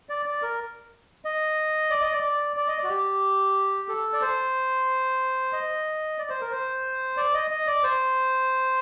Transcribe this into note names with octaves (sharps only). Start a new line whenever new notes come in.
D5
D5
A#4
D#5
D5
D#5
D5
D5
D5
D#5
D5
F#4
G4
A4
D5
C5
D#5
D5
C5
A#4
C5
D5
D#5
D#5
D5
C5